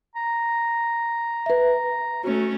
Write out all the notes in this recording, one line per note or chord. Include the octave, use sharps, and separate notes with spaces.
A#5
B4 E5
A3 C#4 F#4